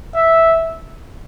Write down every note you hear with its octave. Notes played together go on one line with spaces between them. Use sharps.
E5